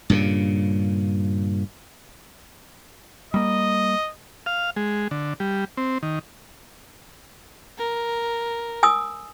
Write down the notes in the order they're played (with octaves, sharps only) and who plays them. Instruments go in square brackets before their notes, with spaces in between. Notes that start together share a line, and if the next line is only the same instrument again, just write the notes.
[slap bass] G2 A#2 C#3
[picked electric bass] G3 A#3 [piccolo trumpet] D#5
[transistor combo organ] F5
G#3
D3
G3
C4
D#3
[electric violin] A#4
[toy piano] G#5 D#6 E6